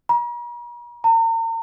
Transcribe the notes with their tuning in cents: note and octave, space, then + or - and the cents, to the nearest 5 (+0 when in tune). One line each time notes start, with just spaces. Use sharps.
A#5 +45
A#5 -40